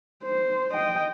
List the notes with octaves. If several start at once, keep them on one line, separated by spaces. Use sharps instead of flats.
C5
D#5 G5